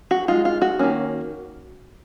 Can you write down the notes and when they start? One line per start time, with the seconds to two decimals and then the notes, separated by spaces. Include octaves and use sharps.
0.11 F#4
0.28 G#3 D#4 F4
0.45 F4
0.61 F#4
0.79 D#3 A#3 C#4